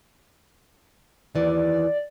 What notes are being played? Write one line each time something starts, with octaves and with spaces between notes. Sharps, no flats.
D#2 E3 D5